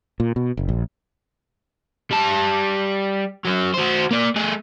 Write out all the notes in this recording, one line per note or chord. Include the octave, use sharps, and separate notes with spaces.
A#2
B2
F#1
A#1
G3 A5
F#3 C#4
F#4 C5
A#3 D5
A3 G#4